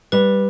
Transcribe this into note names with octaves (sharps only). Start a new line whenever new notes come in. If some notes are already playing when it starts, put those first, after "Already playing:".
G3 B4